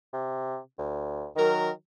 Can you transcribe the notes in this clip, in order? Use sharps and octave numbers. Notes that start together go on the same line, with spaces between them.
C3
D2
D#3 F#3 A#4